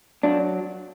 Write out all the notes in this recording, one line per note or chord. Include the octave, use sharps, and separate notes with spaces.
F#3 D4